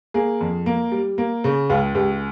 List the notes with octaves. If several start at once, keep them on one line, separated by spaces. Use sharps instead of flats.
A#3 G#4
F2
A#3
G3
A#3
C#3
C#2 F4
C#2 G4